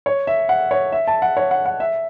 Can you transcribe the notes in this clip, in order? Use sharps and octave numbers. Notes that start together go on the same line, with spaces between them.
C#5
E5
F#5
C#5
E5
A5
F#5
C#5
F#5
F#5
E5